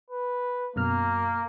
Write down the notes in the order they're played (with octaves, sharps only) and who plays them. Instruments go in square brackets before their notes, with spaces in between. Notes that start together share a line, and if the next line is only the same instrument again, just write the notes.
[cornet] B4
[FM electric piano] F#2 B2 F6 [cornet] A#3